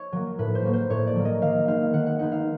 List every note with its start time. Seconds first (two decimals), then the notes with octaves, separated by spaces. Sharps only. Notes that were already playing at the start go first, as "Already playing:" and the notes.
Already playing: C#5
0.12 F#3 A#3
0.38 A2 B4
0.55 C5
0.65 F#3 A#3
0.73 C5
0.90 A2 C#5
1.07 D5
1.16 F#3 A#3
1.25 D#5
1.41 D#3 F5
1.67 G#3 B3 D#4 F5
1.93 D#3 F#5
2.06 F#5
2.19 G#3 B3 D#4 F#5
2.32 F5